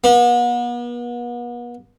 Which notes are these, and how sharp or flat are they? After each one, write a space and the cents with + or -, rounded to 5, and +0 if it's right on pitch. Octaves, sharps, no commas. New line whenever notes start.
B3 -40